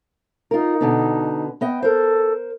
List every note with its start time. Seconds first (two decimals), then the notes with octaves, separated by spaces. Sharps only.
0.51 D#4 F4 A#4
0.81 B2 D3 B3
1.61 B3 D#5 G5
1.82 A4 A#4 C5